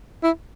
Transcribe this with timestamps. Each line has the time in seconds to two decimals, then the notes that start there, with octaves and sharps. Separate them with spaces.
0.24 E4